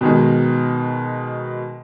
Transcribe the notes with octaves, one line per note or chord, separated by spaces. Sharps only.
B2 D#3 G#3